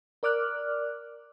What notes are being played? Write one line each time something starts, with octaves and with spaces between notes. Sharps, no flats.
A#4 D5 D6 F6 F#6